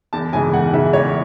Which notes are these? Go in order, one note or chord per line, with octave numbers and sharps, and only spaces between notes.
E2 A5
C#3 E3 G#3 G#5
E2 F#5
C#3 E3 G#3 E5
E2 C#5